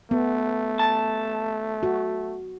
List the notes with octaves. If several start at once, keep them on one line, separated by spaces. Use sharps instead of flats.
A3 B3
A5
F#4